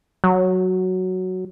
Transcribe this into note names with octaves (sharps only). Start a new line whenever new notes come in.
F#3